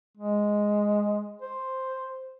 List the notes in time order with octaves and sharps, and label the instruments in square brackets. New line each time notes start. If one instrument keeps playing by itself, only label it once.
[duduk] G#3
C5